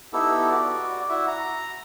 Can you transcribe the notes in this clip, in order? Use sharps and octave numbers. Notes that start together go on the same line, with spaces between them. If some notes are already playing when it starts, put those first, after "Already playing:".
B3 D#4 E4 G4 A4
F#4 D5
E4 F#4 E5 F#5
A#5